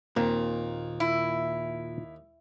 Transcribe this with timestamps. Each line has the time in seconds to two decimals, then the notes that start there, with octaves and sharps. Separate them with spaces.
0.17 D#2 A#2 D#3 A#3 C4 F4
1.00 E4